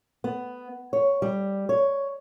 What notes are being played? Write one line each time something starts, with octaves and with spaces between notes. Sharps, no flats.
B3
C#5
G3
C#5